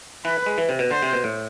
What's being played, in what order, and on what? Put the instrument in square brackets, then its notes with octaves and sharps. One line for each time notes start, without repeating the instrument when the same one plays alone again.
[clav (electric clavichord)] E3 [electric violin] B4
[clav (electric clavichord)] G#3
E3
C3
B2
[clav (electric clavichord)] D3 [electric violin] C5
[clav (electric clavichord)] C3
B2
A2